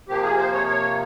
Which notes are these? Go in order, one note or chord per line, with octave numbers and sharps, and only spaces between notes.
C3 F3 A#3 G4
G#4
C5
C#5
C#5